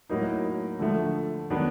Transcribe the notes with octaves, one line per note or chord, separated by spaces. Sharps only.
A2 F#3 A#3 D#4
D3 F3 A3
D#3 F#3 B3 D4